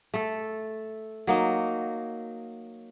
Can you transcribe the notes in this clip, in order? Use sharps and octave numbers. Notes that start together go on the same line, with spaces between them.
A3 A4
F#3 A#3 D#4